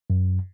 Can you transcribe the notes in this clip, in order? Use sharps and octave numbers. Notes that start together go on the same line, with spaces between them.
F#2